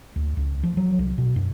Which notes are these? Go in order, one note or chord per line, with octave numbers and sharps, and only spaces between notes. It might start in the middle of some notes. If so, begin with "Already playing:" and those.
D2
C#2
F3
F#3
C2
B2
F#2